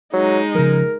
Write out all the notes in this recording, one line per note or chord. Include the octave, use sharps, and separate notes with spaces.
F#3 G#3 D#4
C#3 F3 A#4